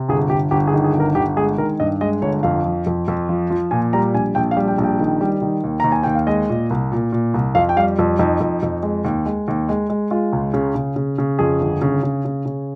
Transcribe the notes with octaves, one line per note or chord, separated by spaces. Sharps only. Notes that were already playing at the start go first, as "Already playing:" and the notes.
Already playing: C3
G1 G#4
G1 G4
G1 G4
G#4
D#3
G#4
G1
A#4
G1 G4
G#3 G#4
D#3 A#4
G2 D#5
G#3 D#5
G1 C#5
F2 F5
F3
F2
F2
F3
F3
A#2 G#5
G3 A#5
A#1 G#5
A#1 G5
F5
G3
G5
A#1
G5
D#3
G3
D#3
D#2
D#2 A#5
G#5
D#2 G5
F5
G#3 D#5
A#2
C2
A#2
A#2
C2
F2 F5
G5
G3 F5
F2
F2 D#4
F2
F2
G#3
D#2
G#3
D#2
G#3
G#3
G#3 F4
C#2
C#3
C#3
C#3
C#3
F2 G#4
G1
C#3
C#3
C#3
C#3